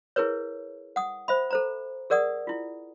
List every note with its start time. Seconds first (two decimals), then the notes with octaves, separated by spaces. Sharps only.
0.16 E4 G#4 A#4 B4 C#5
0.96 F#5 D#6
1.28 C5 E5 B5
1.51 A4 C5 A#5
2.10 G#4 A#4 D5 F#5 D#6
2.47 E4 F4